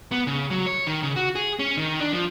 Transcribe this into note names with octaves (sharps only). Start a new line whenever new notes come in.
B3
C#3
F#3
C#5
D#3
C#3
F#4
G#4
C#4
D#3
D4
F3